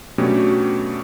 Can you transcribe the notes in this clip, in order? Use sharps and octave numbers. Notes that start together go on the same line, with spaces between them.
B2 F#3 A3 C#4 D4 G4